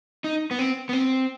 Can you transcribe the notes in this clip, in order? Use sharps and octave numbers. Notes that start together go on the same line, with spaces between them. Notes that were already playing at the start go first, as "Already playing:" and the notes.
D#4
B3
C4
B3
C4